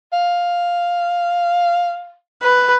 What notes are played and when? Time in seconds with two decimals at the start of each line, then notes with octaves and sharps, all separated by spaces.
0.13 F5
2.43 B4